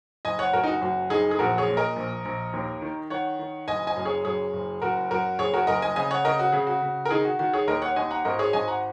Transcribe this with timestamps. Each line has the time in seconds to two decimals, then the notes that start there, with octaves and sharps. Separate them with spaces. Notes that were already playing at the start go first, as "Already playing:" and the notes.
0.25 F#1 D#5 G#5
0.39 C#5 F#5
0.53 F#1 F#4 A#4
0.63 D#4
0.68 F#4
0.81 F#2 F#4
1.10 F#1 D#4 G#4
1.31 G#4
1.39 A#1 F#4 A#4
1.58 G#4 C#5
1.68 A#2
1.77 A#4 D#5
1.96 A#1
2.25 A#1
2.53 D#2
2.82 D#3
3.10 D#3 C#5 F#5
3.39 D#3
3.68 F#1 D#5 G#5
3.87 D#5 G#5
3.96 F#2
4.05 G#4 C#5
4.25 F#2 G#4 C#5
4.53 F#1
4.82 F#1 F#4 A#4
5.10 F#2 F#4 A#4
5.39 F#1 G#4 C#5
5.54 F#4 A#4
5.67 F#1 A#4 D#5
5.82 D#5 G#5
5.96 C#3 D#5 G#5
6.11 C#5 F#5
6.25 C#3 A#4 D#5
6.39 F#4
6.52 C#3 G#4
6.67 F#4
6.82 C#3
7.05 A#4
7.11 D#3 D#4 G#4
7.25 F#4
7.39 D#3 F#4
7.53 G#4 C#5
7.67 D#2 A#4 D#5
7.82 C#5 F#5
7.96 D#2 D#5 G#5
8.11 F#5 A#5
8.25 G#1 A#4 D#5
8.39 G#4 C#5
8.53 G#1 D#5 G#5
8.68 F#5 A#5